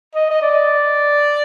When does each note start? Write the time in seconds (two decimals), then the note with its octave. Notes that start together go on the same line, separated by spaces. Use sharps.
0.15 D#5
0.31 D#5
0.42 D5